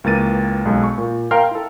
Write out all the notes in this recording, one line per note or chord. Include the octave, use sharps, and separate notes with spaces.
C#2 E3 A#3 A6 D#7
B1 G#3 A4
C#6
A#2
A#4 F5 G5 C6 F6
E4 A4